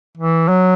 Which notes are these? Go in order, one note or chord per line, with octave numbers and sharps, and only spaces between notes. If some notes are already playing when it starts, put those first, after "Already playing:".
E3
F#3